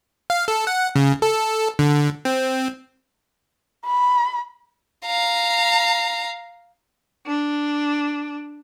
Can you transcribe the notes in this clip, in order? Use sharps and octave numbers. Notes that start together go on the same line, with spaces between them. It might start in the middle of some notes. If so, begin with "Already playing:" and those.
F5
A4
F#5
C#3
A4
D3
C4
B5
F5 A#5
D4